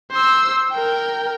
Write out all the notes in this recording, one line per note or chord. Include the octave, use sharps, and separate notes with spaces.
C5 E6
A#4 G5